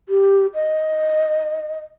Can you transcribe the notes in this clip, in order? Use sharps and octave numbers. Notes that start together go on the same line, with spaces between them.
G4
D#5